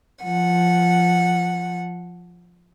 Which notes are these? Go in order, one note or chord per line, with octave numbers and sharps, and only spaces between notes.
F3 F#5